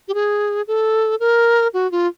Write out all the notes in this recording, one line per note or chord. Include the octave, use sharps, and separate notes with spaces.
G4
G#4
A4
A#4
F#4
F4